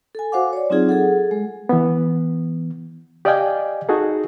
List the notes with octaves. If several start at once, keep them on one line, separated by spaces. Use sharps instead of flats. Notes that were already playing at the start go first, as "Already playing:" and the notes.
A4 G#5
F#4 C5 F5 F#5 D6
C#5 D5
F#3 C4 D#4 F4 G#4
G#4 A4 F#5
G#3
E3 B3
G4 D5 D#5 F5 G5 G#5
D#4 F#4 G#4 A4